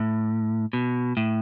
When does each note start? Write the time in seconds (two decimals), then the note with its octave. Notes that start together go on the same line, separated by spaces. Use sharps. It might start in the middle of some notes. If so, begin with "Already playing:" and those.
Already playing: A2
0.73 B2
1.17 A2